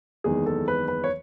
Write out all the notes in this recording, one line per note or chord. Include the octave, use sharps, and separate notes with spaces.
F#1 E2 D#3 G#3 G#4
A4
B4
B4
C#5